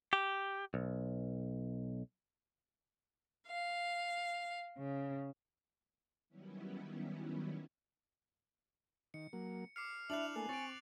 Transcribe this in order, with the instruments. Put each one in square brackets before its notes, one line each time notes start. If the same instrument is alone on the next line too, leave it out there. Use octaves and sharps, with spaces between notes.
[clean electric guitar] G4
B1
[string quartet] F5
C#3
[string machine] D#3 F#3 G3 B3 C#4 E4
[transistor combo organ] D#3 [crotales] C#7
[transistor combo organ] F#3 A#3
[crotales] D6 C7 C#7 [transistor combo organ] F6
[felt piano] D4 E4 [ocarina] E5 [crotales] F#6 F7 F#7
[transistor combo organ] A3 A#3 A4 [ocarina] G#5
[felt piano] C4 [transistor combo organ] C#6 [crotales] A6 D7